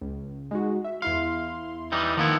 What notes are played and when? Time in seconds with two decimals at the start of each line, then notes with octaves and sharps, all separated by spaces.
0.02 C#2
0.51 G#3 D#4 F#4
0.84 E5
1.02 E2 E4 F5 C6
1.92 E3 G3 D#4
2.17 D#3 F3 A#3 B3 E4